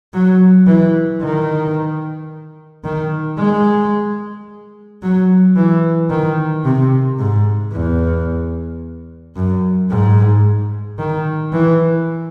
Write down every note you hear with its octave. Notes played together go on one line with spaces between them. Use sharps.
F#3
E3
D#3
D#3
G#3
F#3
E3
D#3
C3
G#2
E2
F#2
G#2
D#3
E3